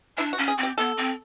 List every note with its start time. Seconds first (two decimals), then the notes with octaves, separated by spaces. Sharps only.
0.18 D4 E4
0.33 F#4
0.38 C#4
0.48 G#4
0.58 C4
0.63 G4
0.78 B3 A4
0.97 C4